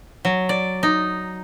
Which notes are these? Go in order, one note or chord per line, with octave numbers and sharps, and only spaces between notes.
F#3
D5
D#4